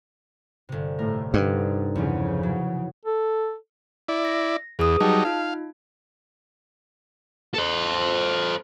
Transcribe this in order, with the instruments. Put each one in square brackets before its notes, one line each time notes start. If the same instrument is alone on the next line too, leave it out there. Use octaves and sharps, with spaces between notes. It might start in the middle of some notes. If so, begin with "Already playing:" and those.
[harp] G1 C3
[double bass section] A2 [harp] A#4
[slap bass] G2 [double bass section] D3 [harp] G3 C4 D#4
[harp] E2 F3 [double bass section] C#3
[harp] F#3
[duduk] A4
[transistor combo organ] E4 D5
[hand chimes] A#6
[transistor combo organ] E2 [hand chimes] G#4 B4 D#6
[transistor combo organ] F#3 G3 D#4 [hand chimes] A5
[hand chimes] D#4 F4 [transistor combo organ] F5
[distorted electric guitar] A4 C5